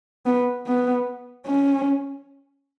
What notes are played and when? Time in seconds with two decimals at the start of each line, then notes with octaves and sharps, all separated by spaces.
0.26 B3
0.67 B3
1.47 C#4